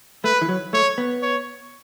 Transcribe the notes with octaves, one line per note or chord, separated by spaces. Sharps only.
A3 B4
E3
F#3
A3 C#5
B3
C#5